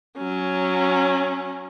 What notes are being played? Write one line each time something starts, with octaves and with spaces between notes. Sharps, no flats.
F#3 C#4